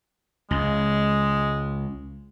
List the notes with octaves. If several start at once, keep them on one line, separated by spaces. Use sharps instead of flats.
C#2 G#3